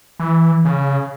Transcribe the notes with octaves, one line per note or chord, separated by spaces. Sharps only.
E3
C#3